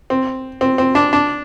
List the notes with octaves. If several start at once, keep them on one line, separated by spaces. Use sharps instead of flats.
C4
C4
C4
D4
D4